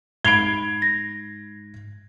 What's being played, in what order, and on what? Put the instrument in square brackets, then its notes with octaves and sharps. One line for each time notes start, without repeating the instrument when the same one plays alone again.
[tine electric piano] G#2 [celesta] B5 F7 G7 [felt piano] G#6 C7 D7
[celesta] A#6